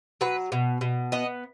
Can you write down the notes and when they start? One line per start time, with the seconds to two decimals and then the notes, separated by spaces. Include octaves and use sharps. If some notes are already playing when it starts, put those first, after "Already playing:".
0.21 F#3 B4
0.52 B2
0.81 B2
1.12 B3 D#5